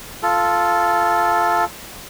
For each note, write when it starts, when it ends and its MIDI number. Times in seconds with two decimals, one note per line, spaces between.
0.23 1.65 65
0.23 1.65 69